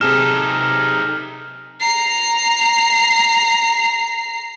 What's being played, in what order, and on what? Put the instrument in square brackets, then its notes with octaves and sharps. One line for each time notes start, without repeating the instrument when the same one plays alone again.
[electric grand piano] C3 G#4 E7 [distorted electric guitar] D#4 A4 [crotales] F6
[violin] A#5 C7